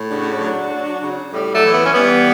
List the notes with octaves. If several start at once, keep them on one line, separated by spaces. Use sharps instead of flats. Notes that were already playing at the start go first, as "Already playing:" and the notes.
Already playing: A2
C#3 D4 F#4
F#3
F#3
C#3
A2 G3
F#3 A3
E3
B3
C#4
E3 G3 B3